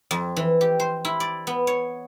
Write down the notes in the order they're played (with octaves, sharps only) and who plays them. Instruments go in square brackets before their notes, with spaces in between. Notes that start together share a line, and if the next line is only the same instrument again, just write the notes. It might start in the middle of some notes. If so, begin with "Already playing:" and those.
[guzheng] F2
E3
G4
C5
E4
D5
B3
C#5